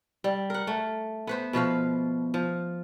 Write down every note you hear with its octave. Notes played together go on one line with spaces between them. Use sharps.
G3
A#4 F#5
A3
B3 B4 C5
B2 F3 B4 F5
F3